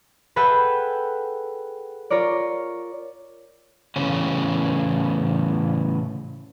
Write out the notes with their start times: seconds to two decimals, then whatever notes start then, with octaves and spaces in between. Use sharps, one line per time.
0.36 G#4 A4 B4 E5 F#5 G5
2.10 F4 A#4 C#5 D5
3.96 A2 C#3 E3 C#4